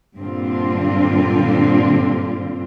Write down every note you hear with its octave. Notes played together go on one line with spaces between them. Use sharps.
G2 A#2 D3 C4 F4